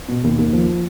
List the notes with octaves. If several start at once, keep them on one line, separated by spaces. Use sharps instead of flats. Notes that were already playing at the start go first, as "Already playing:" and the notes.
B2
D#2
D#2
F3